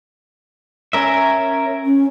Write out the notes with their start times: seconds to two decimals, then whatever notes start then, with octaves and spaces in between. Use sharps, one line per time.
0.93 C#4 A#4 E5
1.85 C#4